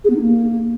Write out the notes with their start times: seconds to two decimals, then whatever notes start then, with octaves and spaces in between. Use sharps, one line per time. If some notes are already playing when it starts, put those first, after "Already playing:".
0.04 G#4
0.10 B3
0.16 D#4
0.21 A#3